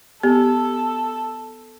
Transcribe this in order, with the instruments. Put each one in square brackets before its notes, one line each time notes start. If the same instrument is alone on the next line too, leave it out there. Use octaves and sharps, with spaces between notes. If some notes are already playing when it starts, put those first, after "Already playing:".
[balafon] B3 G4 [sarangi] A4